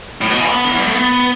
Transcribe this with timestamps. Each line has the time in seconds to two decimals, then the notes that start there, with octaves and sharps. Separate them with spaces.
0.21 A2
0.30 B2
0.40 E3
0.49 B3
0.64 D3
0.72 E3
0.79 G3
0.87 A3
0.95 B3